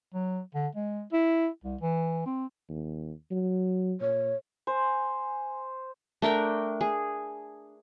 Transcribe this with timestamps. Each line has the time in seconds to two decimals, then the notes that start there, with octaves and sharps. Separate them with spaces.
0.14 F#3
0.55 D3
0.75 G#3
1.13 E4
1.64 C2
1.81 E3
2.26 C4
2.70 D#2
3.31 F#3
4.01 A#2 C#5
4.67 C5 G#5
6.22 A3 D4 A#4 G5
6.81 G#4